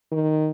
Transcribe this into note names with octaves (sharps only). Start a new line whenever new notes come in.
D#3